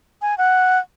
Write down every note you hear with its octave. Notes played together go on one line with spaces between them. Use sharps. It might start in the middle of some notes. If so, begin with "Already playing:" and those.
G#5
F#5